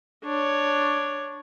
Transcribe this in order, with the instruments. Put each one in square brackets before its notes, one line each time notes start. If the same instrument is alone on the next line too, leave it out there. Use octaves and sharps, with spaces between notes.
[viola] D4 C#5